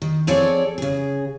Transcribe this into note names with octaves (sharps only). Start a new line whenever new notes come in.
D#3
F3 C4 G#4 A4 C#5 D5
C#3 G#4